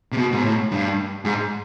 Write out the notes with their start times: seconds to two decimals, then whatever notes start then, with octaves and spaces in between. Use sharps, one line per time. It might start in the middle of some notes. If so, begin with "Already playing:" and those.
0.12 C3
0.17 B2
0.33 G#2
0.45 A2
0.72 G2
1.25 G#2